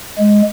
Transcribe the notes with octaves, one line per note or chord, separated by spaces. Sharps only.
G#3